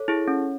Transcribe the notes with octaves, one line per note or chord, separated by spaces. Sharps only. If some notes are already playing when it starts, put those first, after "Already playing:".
Already playing: A4 C#5
E4 G#4
C#4